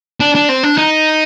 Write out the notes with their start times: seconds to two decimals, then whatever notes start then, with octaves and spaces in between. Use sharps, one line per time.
0.20 D4
0.35 D4
0.49 C4
0.63 D4
0.78 D#4